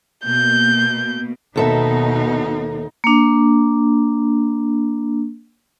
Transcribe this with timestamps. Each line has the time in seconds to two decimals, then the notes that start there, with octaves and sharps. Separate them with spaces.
0.25 B2 A#3 G6
1.56 D#2 B2 D#4 A4 E5
3.04 A#3 D4